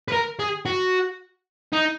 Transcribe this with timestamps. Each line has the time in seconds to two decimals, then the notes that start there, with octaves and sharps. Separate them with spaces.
0.08 B4
0.12 A#4
0.39 G#4
0.65 F#4
1.73 D#4